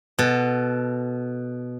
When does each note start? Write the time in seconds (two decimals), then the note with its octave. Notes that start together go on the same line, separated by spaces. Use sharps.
0.19 B2 A4